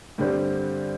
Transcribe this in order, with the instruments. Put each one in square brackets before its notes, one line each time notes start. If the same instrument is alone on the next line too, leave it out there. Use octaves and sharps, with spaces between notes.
[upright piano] G2 D3 G3 C4